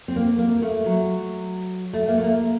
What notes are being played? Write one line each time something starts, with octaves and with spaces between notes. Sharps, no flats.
C4
A#3
A#3
A3
F#3
A3
A#3
A3
A#3